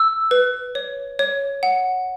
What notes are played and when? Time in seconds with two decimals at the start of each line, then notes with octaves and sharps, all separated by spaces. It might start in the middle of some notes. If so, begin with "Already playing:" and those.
Already playing: E6
0.31 B4
0.75 C#5
1.19 C#5
1.63 F#5